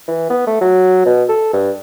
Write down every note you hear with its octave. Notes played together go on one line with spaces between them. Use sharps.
E3
B3
A3
F#3
B2
A4
G2